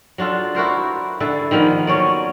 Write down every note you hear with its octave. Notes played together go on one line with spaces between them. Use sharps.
F#3 D4 F4 A4
E4 F#4 A#4 C5
D3 E4 A4
D#3 F3 A#3 B3
F#3 C#4 C#5 D5